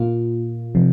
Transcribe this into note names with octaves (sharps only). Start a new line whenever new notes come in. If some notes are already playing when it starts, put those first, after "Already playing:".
Already playing: A#2 A#3 F4
C3 F3